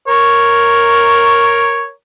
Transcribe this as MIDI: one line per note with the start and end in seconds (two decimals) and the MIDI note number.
0.08 1.89 70
0.08 1.89 73